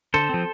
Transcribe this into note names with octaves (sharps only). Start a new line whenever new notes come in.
D3 A4 C5
F3 C4